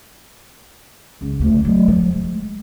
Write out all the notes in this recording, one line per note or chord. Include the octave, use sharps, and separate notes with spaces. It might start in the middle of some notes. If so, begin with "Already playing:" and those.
C#2
D2 A3
D3 E3
F#3 A3
F3
G#3